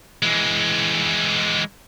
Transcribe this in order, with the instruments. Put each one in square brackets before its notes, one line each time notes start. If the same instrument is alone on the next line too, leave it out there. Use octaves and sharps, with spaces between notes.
[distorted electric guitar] E3 G#3